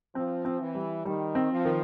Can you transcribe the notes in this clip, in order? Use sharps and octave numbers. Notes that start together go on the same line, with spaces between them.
F3 C4
C4
E3
G3
D#3 G3
C4
F3
D#3